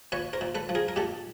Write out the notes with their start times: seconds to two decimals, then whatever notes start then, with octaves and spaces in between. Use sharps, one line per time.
0.12 A#2 B4 C#5
0.33 A#4 C5
0.41 A#2
0.55 A4 B4
0.69 F3
0.75 G#4 A#4
0.88 A#4
0.96 A#2 G4 A4